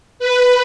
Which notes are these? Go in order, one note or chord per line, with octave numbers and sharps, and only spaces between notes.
B4